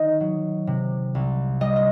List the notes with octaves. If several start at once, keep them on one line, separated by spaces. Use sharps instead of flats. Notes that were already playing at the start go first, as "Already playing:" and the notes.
Already playing: D#3 D#5
F#3
C3
C2
G3 D#5
D#5